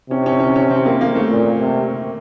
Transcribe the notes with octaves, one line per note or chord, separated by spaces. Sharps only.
C3 C#4
C#4
C#4
C#4
C4
A#3
A#3
A3
A#2
C3